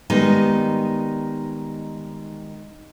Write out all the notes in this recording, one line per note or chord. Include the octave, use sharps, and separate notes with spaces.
D#3 G3 G#3 B3 D#4